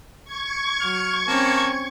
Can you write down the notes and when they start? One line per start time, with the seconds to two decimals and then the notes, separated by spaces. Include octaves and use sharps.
0.25 C#6 G#6
0.80 F#3 F6
1.28 A#3 C4 C#4 A5